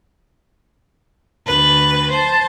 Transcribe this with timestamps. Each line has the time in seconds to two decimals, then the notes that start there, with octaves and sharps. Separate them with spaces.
1.46 D2 B4
2.11 C5 A5